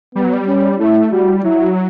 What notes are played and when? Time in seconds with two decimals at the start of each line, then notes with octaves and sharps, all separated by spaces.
0.15 G3 B3
0.24 F#3
0.33 G3
0.48 C#4
0.79 A3 E4
1.12 G3 F#4
1.44 F#3 E4